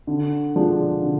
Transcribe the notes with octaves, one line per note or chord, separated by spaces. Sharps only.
D3
F3 G#3 D4
D3